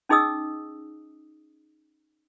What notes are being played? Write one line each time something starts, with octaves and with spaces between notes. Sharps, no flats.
C#4 D#4 G#4 D#5 D#6 E6